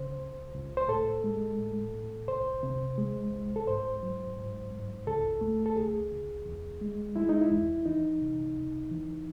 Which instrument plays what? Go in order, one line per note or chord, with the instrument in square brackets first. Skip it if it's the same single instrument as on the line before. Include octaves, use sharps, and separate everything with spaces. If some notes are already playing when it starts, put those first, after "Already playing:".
Already playing: [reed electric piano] C#3 C5
C#2
C#2
C5
A2 A4
G#3
A2
A2
C2 C5
C3
G#3
C2
A4
G#2 C5
F#3
G#2
G#2
C#2 A4
A3
A4
C#2 G#4
C#2
E2
G#3
G#3 E4
D#4
E4
E2
E3 D#4
C3
C#2
E3